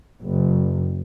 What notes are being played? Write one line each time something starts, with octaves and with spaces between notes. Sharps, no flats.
F#1